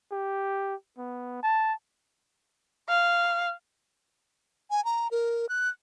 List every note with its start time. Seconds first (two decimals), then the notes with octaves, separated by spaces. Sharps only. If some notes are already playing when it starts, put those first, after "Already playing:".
0.12 G4
0.98 B3
1.43 A5
2.88 F5
4.70 G#5
4.85 A#5
5.11 A#4
5.49 F#6